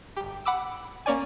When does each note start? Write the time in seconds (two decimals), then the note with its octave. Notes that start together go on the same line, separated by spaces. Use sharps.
0.17 G1 G4
0.46 F#5 B5 D6 E6
1.06 A#3 C#4 D5 G#5